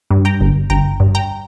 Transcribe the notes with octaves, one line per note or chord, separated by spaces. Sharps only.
G2
G5 A#5
G1
G1 G5 A#5
G2
G5 A#5